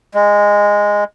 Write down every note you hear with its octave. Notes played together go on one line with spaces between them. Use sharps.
G#3